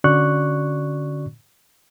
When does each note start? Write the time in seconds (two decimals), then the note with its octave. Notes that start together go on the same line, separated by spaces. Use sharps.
0.04 D3 C#4 F#4 D5 C#6 F#6